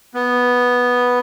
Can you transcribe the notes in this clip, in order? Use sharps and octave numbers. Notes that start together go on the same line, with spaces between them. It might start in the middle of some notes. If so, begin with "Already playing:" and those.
B3